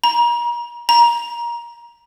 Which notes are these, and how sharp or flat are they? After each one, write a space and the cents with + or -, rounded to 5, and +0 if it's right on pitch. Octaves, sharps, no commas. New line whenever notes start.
A#5 +35
A#5 +20